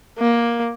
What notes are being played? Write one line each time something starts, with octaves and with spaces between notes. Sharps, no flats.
A#3